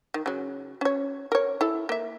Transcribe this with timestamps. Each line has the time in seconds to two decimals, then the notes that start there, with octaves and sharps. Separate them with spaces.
0.14 D#3
0.26 C#3 F#3
0.81 C#4 C#5
1.32 A#4 C#5
1.61 E4 A4
1.89 A#3 E5